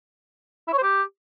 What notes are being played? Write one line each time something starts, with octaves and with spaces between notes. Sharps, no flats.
E4
C#5
C5
G4